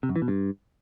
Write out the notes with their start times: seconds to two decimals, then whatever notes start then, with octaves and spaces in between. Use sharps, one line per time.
0.03 C3
0.09 F#2
0.16 E3
0.22 B2
0.28 G2